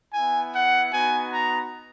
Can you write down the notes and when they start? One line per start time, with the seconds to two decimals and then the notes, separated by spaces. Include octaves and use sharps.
0.13 B3 E4 G#5
0.53 F#5
0.92 B3 D#4 F#4 G#5
1.32 A#5